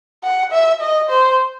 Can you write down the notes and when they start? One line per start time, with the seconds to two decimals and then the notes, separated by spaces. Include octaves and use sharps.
0.23 F#5
0.52 E5
0.81 D#5
1.10 C5